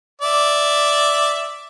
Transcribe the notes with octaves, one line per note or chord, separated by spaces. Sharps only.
D5 E5